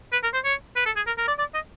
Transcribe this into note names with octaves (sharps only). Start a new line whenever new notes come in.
B4
A#4
C5
C#5
B4
A4
G#4
A#4
A#4
D5
D5
D#5